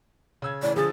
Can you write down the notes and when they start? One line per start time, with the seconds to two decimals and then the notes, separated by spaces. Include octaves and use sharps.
0.42 C#3 E6 G#6
0.62 A2 C#3 E3 D5
0.76 D3 F3 G#4 A6